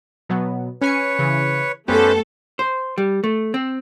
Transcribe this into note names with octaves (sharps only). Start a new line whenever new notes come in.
B2 F#3 B3
C#4 B4 C#5 G#5 C#7
C#3 E3
F#2 A3 B3 C#4 G4 A4 B4 C5
C5
G3
A3
C4